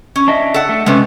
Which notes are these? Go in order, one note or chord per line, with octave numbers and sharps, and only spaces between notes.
C#4
D4 D#5 E5
A4 F#5
A3
C3 G#3 C#4 B4